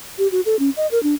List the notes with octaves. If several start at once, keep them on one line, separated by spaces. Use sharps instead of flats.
G4
F#4
A4
C#4
D#5
A#4
D4